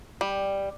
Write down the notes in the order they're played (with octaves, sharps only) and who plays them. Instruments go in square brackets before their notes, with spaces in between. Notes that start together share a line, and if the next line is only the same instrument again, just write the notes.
[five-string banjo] G3